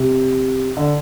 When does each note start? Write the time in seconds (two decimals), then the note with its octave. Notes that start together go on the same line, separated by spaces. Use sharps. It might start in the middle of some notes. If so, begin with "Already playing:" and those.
Already playing: C3
0.77 D3